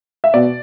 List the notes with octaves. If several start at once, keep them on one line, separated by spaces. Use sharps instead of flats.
E5
B2 D5